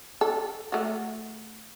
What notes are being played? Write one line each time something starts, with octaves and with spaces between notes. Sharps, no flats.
A4
A3 F#4